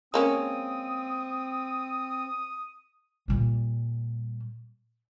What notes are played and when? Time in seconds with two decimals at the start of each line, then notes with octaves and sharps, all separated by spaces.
0.14 G#3 A#3 C4 C#4 D#6
3.28 A#2 G3